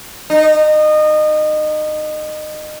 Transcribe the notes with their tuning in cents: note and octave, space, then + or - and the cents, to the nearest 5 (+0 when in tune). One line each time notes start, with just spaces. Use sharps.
D#4 -25